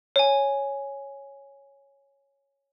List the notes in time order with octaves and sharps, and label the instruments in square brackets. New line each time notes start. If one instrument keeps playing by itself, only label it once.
[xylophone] C#5 G#5